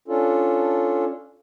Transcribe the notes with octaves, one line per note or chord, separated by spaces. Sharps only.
C#4 D4 F4 A4